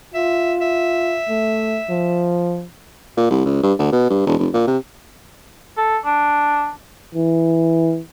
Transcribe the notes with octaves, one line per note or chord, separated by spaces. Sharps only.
F4 E5
E5
A3
F3
A#2
C2
C#2
G2
D2
B2
G2
E1
F1
A#2
C3
A4
D4
E3